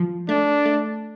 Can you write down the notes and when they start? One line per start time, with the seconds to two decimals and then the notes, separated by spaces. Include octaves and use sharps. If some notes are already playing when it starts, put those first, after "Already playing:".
Already playing: F3
0.29 A3 D4
0.66 A3